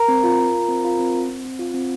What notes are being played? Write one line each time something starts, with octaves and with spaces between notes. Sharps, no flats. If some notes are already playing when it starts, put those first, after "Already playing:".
Already playing: A#4 A#5
C4
F4
F4
F4
C4
F4
C4
C4
C4
C4
F4
C4